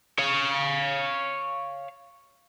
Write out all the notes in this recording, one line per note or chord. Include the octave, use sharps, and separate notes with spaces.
C#5 F5